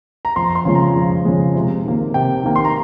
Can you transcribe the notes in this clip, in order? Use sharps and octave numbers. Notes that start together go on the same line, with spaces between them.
A#5
F2 C6
C6
C#3 F3 G#3
A#5
F2
C#3 F3 G#3
C3
D#3 A#3
C3 G5
D#3 A#3
C6
A#5